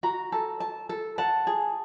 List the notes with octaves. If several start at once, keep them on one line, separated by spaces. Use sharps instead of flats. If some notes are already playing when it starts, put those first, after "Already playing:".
F#4 A#5
A4
A5
A4
F#5 A5
G#4